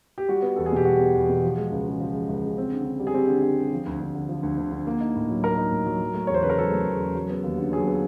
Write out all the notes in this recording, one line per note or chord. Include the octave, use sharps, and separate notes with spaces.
G4
G3 F#4
B3
E2 A4
G#4
B2 G4
G3 F#4
B3
E2
B2
F3
G#3
C#2
C#3
F3
G#3
C#2
C#3
C4
D3
D3
G3
G#4
C4 G4
D3
D3
G3
F3
D2
D2
D3
F3
D2
D2
D3
A#3
D#4
A2
F#3
A#3 A#4
D#4
A2
F#3
F#3
A3
E2 C#5
C5
C#3 B4
A#4
F#3 A4
A3
E2
C#3
F#3
B3
D#2
D3
F#3 G#4
B3